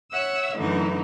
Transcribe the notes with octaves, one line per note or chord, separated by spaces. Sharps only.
C#5 E5 F#5 E6
F#2 A2 D3 E3 D#4